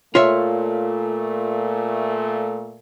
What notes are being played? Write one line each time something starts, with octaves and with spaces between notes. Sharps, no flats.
A#2 A3 F4 C#5 E5